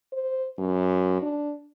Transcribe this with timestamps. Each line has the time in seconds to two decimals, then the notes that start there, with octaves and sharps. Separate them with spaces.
0.13 C5
0.58 F#2
1.22 D4